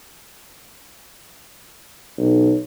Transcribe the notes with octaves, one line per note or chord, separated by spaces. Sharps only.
B1